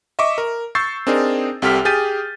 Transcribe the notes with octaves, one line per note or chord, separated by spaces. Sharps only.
D#5 E5 C#6 D6
A#4
C#6 E6 G6 A6 C7
C4 D4 D#4 G#4 A#4
C2 C3 G4 A4 F6 B6
G4 G#4 G6 A6 B6 D#7